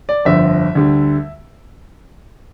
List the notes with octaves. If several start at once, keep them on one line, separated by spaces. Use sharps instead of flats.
D5
G1 F2 D3 F3 E5
D2 D3 G3